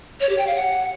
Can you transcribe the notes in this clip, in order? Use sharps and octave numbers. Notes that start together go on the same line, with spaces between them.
C#5
G4
G5
F5
F#5